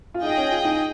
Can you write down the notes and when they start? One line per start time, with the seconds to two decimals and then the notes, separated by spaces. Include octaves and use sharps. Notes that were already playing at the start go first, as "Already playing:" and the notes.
0.14 F4
0.23 D#4 G#4 D#5 G5
0.37 C#4
0.51 F4
0.65 D#4